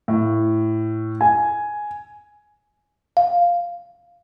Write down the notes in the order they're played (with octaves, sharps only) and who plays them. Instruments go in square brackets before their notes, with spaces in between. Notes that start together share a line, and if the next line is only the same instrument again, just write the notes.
[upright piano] A2
G#5
[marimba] F5